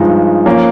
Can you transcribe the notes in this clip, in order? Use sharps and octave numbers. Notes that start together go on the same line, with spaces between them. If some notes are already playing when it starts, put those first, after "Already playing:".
Already playing: G2 F3 G#3 D#4
F3 A#3 C#4